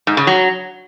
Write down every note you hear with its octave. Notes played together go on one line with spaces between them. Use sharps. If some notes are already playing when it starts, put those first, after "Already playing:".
G#2
C#3
F#3